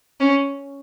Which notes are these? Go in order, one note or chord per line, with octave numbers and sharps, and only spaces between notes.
C#4